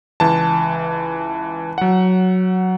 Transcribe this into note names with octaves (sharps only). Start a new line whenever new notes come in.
C#2 E3 A5
F#3 F#5